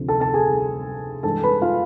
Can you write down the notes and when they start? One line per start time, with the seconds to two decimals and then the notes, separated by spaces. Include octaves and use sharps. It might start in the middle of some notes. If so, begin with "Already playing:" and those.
Already playing: D2 C3 F3
0.09 A4 A5
0.20 A4 A5
0.34 G#4 G#5
1.23 G2 E3 G#3 A4 A5
1.44 B4 B5
1.62 F4 F5